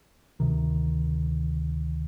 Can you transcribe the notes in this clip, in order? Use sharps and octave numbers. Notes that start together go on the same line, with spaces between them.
D2 C3 D#3